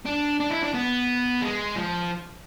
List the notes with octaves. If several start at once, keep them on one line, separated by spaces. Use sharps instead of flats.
D4
D4
E4
D4
B3
G#3
F3